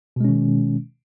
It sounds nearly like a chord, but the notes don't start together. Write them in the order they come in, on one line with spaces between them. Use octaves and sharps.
B2 G#3 C#4 D#3